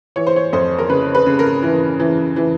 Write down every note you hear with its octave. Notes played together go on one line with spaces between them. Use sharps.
E3 C#5
C5
C#5
F2 C5
A#4
C#3 B4
B4
C#3
A#4
E3
E3
E3